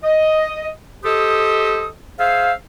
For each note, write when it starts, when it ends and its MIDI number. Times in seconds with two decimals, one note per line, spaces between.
0.04 0.68 75
1.04 1.87 67
1.04 1.87 69
1.04 1.87 72
1.04 1.87 75
1.04 1.87 87
2.19 2.52 68
2.19 2.52 72
2.19 2.52 76
2.19 2.52 77